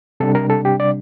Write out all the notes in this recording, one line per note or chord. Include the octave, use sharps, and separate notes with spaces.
C3 G3 D4 A4
A#4
A4
G4
D5